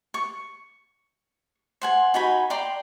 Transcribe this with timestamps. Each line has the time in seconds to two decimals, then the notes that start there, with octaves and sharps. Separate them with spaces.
0.14 C#6
1.82 C5 F#5 G#5
2.14 D#4 F#4 G#5 B5
2.50 D5 G5 A#5 C6